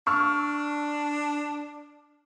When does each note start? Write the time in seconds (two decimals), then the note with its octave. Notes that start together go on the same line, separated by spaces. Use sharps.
0.07 D4 C#6 E6 F6